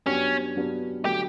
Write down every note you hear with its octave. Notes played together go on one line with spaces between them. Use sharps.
G2 F#3 B3 C#4 D4 G4
G2 F#3 B3 D4 G4
D3 F#3 A3 G4